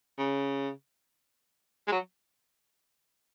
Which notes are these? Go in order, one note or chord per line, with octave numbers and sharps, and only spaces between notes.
C#3
G#3
F#3